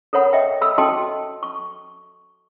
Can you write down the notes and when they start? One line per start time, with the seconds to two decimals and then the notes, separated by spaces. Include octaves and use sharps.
0.13 A4 A#4 C#5 F#5 B5
0.33 D#5 E5 G5
0.61 A4 B5 E6
0.78 F#4 A4 D#5 G5 A5 C6
1.43 C#6